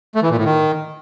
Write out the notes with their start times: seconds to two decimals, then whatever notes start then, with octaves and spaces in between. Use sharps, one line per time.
0.15 A3
0.23 E3
0.30 A#2
0.37 A2
0.45 D#3